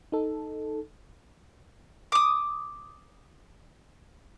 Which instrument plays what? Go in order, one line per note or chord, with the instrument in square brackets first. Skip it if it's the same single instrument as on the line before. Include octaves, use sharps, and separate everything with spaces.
[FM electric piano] D#4 A4
[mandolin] D6 D#6